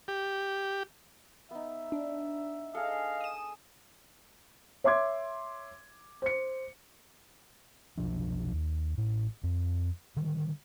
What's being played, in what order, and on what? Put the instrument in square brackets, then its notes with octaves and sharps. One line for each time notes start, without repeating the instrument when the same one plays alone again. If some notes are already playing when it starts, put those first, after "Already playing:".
[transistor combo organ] G4
[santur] B3 D#4 [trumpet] E5
[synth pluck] D4
[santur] G#4 A4 [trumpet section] D#5 F5
[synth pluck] D#6 E7
[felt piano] C#5 E5 C6 D6 G#6
C5 C#7
[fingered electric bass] F1 B1 F3 D4
D#2
A1 A2
F2
D3 D#3 G3